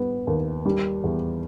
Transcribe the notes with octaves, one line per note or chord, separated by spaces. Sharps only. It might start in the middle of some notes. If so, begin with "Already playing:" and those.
Already playing: G3 B3
D#2
G3
E2